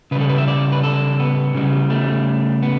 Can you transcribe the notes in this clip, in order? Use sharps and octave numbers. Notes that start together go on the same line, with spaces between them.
C#3 G3 B4
A4
B4
E5
D5
B4
A4
B3
C#3 G3
A3
B3